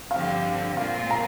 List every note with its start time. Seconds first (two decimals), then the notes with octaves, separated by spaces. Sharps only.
0.11 G2 D3 F3 C4 G4 F5
0.77 A#2 G#3 C4 F4 A#4 F5
1.11 A#5